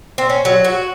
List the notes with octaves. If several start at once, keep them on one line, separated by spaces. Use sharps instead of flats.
C4
C#4
F#3
F#4